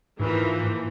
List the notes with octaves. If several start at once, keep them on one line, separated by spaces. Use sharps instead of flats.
G#2 E3 F3 A#3